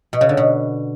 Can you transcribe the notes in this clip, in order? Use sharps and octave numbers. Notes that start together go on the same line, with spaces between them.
B2
C#3
D3
B2